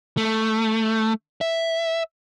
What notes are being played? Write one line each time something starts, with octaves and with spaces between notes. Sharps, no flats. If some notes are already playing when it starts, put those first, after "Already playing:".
A3
E5